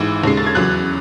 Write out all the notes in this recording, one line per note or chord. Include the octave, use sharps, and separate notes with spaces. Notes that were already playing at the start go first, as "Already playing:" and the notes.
Already playing: G#1 G#2 E3 E6
D#2 C#3 G#3 C7
A6
G#6
E2 C#3 F#3 F#6